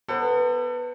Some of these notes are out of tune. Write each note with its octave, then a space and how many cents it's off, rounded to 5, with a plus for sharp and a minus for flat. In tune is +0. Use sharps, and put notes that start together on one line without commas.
B3 +0 A4 +40 C5 +25